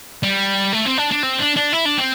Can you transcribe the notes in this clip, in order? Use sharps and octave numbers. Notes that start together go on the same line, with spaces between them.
G3
A3
C4
D4
D4
C4
D4
D4
E4
D4
C4